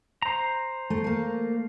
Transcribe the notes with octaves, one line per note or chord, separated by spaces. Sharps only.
C5 A#5
A3
A3 A#3